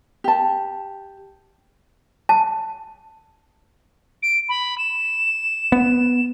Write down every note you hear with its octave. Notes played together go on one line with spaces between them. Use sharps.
G4 A5
A5
D7
B5
E7
B3